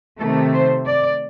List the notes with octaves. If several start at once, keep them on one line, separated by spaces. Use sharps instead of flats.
C3 D#3 A3 A4
C5
D5